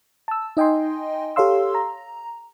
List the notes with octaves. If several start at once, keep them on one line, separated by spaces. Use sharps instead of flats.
A5 E6
D#4 D#5 G5 G#5 C6
G4 A4 C#5 F5 C6 E6
A#5